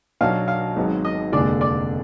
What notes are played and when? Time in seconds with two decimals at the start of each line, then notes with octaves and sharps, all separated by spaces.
0.21 B1 B2 F#3 D4 F5
0.48 F5
0.76 G#1 G#2 F#3 B3
1.05 D#5
1.32 F1 D#2 D3 G#3 D4 D5
1.61 D5